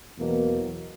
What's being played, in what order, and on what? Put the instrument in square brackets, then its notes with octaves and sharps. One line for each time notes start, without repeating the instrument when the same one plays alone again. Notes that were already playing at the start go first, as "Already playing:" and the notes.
[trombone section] E2 B2 F#3 A#3